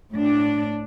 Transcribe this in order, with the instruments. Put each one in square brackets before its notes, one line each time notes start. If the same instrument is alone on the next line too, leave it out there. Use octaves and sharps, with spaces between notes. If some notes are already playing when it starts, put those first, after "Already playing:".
[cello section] A2 D4